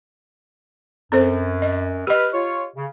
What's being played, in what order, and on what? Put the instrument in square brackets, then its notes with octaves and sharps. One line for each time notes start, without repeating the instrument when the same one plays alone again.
[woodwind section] F#2 [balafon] C4 A4 C5
[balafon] D#5
[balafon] G4 D#5 [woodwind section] B4 F6
[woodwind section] F4 C#5
C#3